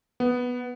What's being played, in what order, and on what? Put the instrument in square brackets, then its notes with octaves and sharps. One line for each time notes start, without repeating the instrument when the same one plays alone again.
[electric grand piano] B3